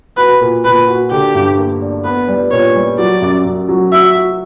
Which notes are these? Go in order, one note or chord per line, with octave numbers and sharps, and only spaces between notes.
F#4 B4
A#2
A#2 B4
F#4
D3 G4
G2
A#3
D4
B3 B4
G3
A#2 C#5
G3
F#3 D5
F#2
F#2
F#3
F#4 E5
F#4